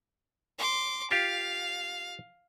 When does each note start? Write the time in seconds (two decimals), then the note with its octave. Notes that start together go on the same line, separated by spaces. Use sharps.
0.58 C6 D6
1.11 F4 G4 F5